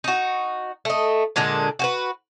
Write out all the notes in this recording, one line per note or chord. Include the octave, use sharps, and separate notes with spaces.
D#4 F#4
A3 D#5
A#2 D3 G#3 D4
F#4 G4 B4